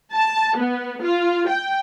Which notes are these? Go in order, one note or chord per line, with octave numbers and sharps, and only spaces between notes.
A5
B3
F4
G5